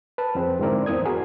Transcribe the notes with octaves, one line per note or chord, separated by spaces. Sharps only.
B4 A5
F2 C4 G#4
G#2 D3 C4 E4 A#4 D5
E2 E3 C4 D#6 G#6
F#4 G#4 A#4 G#5